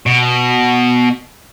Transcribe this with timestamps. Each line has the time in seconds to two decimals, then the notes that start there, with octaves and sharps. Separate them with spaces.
0.06 B2